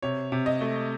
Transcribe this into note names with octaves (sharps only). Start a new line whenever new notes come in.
C3 C#5
C3
D#5
A3